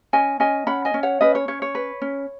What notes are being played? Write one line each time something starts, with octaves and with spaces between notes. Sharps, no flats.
C#4 D#5 G#5
C#4 D#5 G#5
C#4 F#5 B5
D#5 G#5
C#4
C#5 F#5
C#4 B4 D#5
C#5
C#4 C#5
C#5
B4
C#4